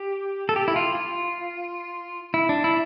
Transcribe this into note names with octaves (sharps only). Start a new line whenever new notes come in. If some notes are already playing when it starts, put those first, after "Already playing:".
Already playing: G4
A4
G4
E4
F4
F4
E4
D4
E4